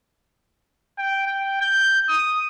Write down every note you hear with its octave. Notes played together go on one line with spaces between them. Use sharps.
G5
G5
G6
D#6